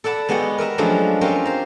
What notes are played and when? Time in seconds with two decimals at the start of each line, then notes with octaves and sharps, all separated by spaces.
0.04 A4 D5 F#5 A5 B5
0.28 G#3 B3 F#4 G4 F#5
0.58 A#4 B4 E5 A#5
0.78 F3 F#3 G#3 A3 C#4 D4
1.21 C4 C#4 F4 G4 A#4
1.45 C5 A#5